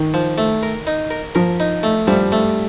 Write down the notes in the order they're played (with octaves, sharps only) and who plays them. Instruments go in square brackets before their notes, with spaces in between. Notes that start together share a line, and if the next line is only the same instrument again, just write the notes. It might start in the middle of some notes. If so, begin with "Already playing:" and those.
Already playing: [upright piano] D#3
[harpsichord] F3
A3
A#4
D#4
A#4
[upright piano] F3 [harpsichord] A#4
[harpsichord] D#4
A3
[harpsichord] F3 [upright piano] G3
[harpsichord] A3